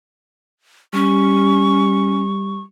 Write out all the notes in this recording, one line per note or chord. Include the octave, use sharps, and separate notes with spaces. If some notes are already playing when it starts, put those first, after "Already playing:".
G3 C#4 C#6